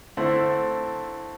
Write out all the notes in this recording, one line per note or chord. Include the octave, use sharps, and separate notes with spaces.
D3 A3 C4 E4